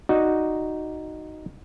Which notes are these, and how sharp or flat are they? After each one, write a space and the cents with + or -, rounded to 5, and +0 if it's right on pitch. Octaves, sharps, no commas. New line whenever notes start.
D#4 -5 F#4 +0 D5 +0